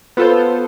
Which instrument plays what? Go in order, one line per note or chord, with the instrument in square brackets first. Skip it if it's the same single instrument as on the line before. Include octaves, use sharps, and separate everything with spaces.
[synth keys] B3 F4 A4 C5